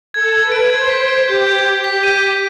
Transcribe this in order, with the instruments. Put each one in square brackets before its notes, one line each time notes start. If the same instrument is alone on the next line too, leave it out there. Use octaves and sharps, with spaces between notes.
[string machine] A4 [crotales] G#6
[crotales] G#6
[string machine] B4
[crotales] D7
[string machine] C5 [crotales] G#6
[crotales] B6
D7
[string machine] G4 [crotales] G6
[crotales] G6
G6
[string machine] G4 [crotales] B6
[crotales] D#7
D#7